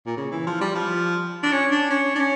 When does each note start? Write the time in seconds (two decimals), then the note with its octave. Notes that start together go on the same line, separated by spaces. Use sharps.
0.06 A#2
0.17 C#3
0.32 E3
0.47 F3
0.61 G3
0.75 F3
1.43 D4
1.52 C#4
1.72 D4
1.90 C#4
2.15 D4
2.20 C#4